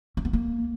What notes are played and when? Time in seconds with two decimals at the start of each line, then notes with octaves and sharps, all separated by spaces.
0.17 C#4
0.25 B3
0.33 A#3